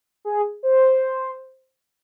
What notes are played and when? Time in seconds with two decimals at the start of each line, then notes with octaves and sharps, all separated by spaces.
0.25 G#4
0.63 C5